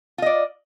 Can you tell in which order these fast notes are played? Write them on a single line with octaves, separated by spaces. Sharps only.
F4 D#5 D5